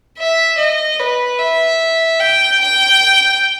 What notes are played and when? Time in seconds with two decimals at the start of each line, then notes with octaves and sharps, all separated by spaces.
0.18 E5
0.58 D#5
0.99 B4
1.39 E5
2.20 G5
2.60 G5